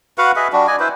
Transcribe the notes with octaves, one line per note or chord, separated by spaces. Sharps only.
F#4 B4 F5 F#5
G#4 B4 D#5 E5
G3 D4 F#4
D5 D#5 G#5
E4 B4 C5